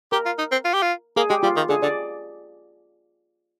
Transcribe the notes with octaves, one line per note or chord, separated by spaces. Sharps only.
G4 A#4
F4
D#4
C4
F4
G4
F4
A#3 G#4
G#3 G4
G3 F4
D#3
D3 G#4
D3 D5